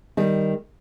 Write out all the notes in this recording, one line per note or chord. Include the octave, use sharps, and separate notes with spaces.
D#3 G3